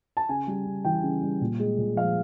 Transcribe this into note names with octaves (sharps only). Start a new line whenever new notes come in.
A5
C#3 G#5
G3
C#3
E3 G5
C#3
G3
A#2
G#3
A#2
F3 F5